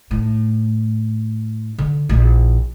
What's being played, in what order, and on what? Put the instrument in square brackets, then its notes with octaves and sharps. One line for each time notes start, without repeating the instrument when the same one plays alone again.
[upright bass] A2
D3
A#1 E4